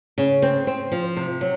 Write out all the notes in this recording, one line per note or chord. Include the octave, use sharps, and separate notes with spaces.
C#3
C4
C4
F3
C3
F#3